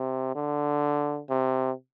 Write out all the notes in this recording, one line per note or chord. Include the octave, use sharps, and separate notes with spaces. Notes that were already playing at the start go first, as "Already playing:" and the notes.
Already playing: C3
D3
C3